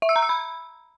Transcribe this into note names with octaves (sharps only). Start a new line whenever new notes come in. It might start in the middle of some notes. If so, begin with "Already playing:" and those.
E5
E6
A#5
E6
B5